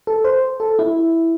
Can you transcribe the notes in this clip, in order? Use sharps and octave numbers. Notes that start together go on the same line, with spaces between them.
A4
C5
A4
E4